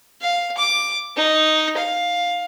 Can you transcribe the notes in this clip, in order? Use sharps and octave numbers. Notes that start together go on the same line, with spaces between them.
F5
D6
D#4
F5